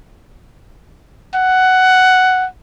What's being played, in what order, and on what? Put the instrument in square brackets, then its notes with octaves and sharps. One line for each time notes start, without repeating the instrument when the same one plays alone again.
[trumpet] F#5